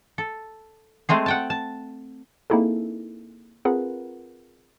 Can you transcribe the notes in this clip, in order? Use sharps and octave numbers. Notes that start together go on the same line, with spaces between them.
A4
G#3 A3 C4 G#4
F#5 G5 A5
A5
A#3 C4 D#4 E4 G#4 A4
C4 F4 G#4 A#4 B4 F#5